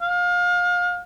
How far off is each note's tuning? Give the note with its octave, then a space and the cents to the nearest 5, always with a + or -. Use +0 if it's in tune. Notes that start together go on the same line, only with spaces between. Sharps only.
F5 +30